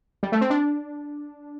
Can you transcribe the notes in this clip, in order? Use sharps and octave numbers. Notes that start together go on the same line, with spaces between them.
G3
A3
C4
D4